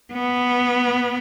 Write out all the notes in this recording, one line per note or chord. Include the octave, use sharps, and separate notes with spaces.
B3